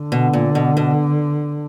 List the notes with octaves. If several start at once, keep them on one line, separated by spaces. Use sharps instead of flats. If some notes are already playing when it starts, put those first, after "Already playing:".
Already playing: D3
B2
A#2
B2
B2